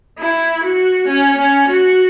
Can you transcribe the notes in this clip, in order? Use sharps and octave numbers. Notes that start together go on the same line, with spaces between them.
E4
F#4
C#4
C#4
F#4